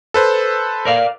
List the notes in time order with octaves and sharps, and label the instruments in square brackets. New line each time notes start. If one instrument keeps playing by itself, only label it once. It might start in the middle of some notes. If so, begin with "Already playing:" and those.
[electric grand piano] A4 B4 C5
[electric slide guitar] A#4 D5 F5